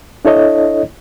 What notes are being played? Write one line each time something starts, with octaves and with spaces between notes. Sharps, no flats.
D4 E4 A4 C#5 D#5